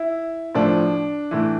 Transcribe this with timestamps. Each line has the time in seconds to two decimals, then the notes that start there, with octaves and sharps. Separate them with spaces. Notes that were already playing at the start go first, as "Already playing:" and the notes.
Already playing: E4
0.55 A2 F3 D4
1.31 A2 E3